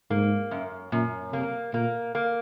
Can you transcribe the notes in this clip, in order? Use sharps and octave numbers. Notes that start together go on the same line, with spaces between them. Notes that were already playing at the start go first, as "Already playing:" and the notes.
G#2 A#3
F#2
F#2 A#2
C3 A#3
A#2 A#3
A#3